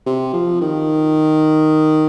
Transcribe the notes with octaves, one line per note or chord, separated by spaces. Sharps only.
C3
F3
D#3